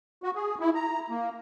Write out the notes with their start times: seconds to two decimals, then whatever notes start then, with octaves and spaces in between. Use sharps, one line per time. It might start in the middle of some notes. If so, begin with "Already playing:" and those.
0.23 F#4
0.35 G#4
0.60 E4
0.75 A#5
1.10 A#3